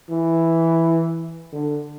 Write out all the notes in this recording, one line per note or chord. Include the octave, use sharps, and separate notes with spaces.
E3
D3